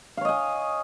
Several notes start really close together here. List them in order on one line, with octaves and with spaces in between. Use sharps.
F5 C#5 D#5 G#5